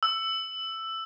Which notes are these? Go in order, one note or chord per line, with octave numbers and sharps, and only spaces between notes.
E6